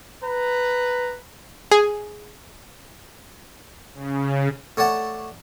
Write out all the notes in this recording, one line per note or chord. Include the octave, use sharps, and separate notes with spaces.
B4 A#5
G#4
C#3
A3 C#5 D5 F#5 A5